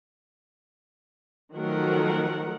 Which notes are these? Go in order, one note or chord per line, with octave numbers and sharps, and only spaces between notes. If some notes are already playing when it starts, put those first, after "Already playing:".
D#3 F3 F#3 A3 A#4 F#5